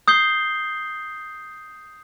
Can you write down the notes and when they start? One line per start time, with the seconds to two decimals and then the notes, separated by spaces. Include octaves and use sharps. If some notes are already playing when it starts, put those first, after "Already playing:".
0.08 D#6 G6 C7 G7